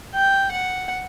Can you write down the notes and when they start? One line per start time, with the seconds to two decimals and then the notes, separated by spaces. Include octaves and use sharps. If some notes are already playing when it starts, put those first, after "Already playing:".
0.14 G5
0.51 F#5